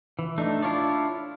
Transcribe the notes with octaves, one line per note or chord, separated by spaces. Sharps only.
E3
A3 D4 D#4
D4 E4 F4 C#5 D5